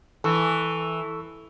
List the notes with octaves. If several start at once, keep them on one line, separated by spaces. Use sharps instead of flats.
E3 A4 C#6 E6